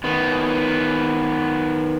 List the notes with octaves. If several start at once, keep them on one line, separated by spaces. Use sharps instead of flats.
D#3 B3